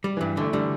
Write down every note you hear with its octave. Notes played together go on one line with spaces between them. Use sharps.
G3
E3
G2
D3 A3
D3 G3